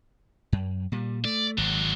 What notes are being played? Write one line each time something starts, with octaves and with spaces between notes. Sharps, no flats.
F#2
A#2 G3
A3 D5
G#1 F#3 D4